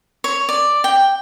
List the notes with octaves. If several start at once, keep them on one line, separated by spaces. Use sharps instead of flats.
C#5
D5
G5